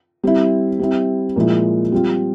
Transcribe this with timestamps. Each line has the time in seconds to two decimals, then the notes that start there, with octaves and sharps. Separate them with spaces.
0.24 G3 C4 E4
0.79 G3 C4 E4
1.36 A#2 F3 G#3 E4
1.92 G3 C4 F4